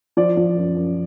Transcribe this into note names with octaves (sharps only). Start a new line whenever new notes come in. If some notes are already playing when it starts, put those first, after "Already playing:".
F3 D5
F3
F#2
F#2